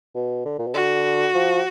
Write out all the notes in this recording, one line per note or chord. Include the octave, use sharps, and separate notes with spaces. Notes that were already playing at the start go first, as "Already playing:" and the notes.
B2
D3
A#2
B2
D3 F#4
F3